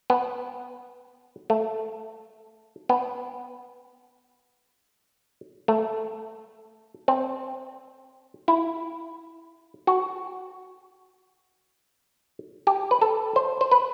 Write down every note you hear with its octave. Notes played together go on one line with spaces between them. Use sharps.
B3
A3
B3
A3
C4
E4
F#4
G4
B4
A4
C5
C5
B4